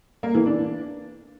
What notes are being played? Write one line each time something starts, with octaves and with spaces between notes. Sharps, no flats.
A#3
E3
D4